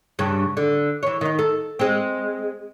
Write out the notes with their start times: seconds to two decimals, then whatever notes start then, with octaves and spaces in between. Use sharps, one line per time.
0.19 G2 C#3
0.57 D3
1.03 E3 C#5
1.21 D#3 D#4
1.39 A4
1.79 G#3 C4